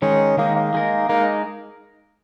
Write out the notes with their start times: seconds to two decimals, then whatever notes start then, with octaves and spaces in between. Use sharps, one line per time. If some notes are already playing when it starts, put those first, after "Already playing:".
0.02 D#3 G#3 C#4 D#4
0.37 D#3 G#3 A#3 D#4
0.56 A#3
0.74 G#3 D#4 A#4
1.09 G#3 A#3 D#4 A#4